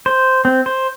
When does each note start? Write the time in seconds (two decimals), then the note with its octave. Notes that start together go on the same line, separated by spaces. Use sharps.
0.06 C5
0.45 C4
0.66 C5